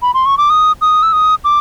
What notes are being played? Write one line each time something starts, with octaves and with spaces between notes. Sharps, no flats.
B5
C6
C#6
D6
D#6
D#6
E6
D#6
D6